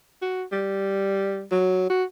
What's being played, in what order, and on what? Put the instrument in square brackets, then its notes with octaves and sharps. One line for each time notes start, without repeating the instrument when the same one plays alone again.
[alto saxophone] F#4
G3
F#3
F#4